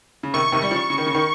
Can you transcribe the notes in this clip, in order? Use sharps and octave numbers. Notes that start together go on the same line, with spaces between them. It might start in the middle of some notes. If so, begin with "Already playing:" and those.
C#3
C3 D#3 C#6
C3 D#3
G3
C#3 F3
C#3
D#3
C#3
D#3